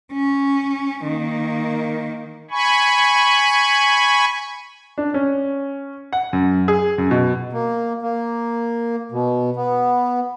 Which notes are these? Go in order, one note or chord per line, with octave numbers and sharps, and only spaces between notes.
C#4
D#3 A#3
G#5 B5 C#6
D4
C#4
F#5
F#2
G#4
F#2
B2
A#3
A#3
B2
B3